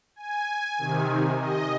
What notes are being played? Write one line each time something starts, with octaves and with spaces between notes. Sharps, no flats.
G#5
C3 D#3
D#5